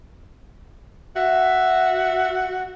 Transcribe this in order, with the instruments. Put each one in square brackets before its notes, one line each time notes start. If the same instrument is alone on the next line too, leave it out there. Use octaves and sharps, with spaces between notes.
[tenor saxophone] F#4 [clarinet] E5